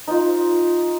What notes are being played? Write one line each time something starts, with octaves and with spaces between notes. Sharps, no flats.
D#4 F4